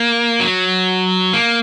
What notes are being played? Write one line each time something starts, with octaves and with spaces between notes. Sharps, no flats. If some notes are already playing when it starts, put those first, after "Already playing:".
Already playing: A#3
F#3
A#3